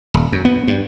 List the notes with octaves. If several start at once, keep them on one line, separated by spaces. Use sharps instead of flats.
D#1
F#2
B3
G2